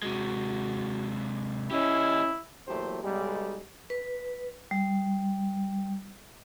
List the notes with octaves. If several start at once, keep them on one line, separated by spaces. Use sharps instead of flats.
C3 G#3 F#4
C#4 E4 G4 D#5
E2 A#2 F#3 A3 G4 C5
B1 G3 G#3
B4
G3